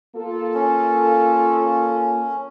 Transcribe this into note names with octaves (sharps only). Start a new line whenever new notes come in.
A#3 F4 A4
C#4